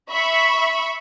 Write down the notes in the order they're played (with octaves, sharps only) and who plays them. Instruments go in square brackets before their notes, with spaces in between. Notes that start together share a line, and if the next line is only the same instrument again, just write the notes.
[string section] E5 B5 C#6